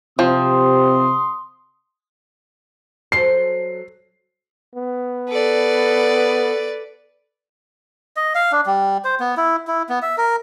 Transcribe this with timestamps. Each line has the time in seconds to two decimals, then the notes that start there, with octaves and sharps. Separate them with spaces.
0.19 C3 F3 C4 C6 D#6
3.12 F#3 A4 C5 C7
4.76 B3
5.30 A4 B4 D5
8.17 D#5
8.35 F5
8.52 D4
8.66 G3
9.04 C5
9.20 B3
9.37 E4
9.67 E4
9.89 B3
10.02 E5
10.18 A#4